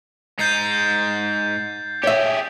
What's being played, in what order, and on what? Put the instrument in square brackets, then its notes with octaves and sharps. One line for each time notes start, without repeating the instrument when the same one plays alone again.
[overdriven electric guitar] G#2 D#4 [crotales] G6 A6 C7
[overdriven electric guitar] G4 G#4 [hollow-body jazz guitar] C#5 E5